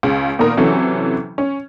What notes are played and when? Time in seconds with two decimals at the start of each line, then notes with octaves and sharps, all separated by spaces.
0.03 C#2 C#3
0.39 A#2 D#3 B3 A#4
0.57 C3 E3 F#3 C#4 A4
1.38 C#4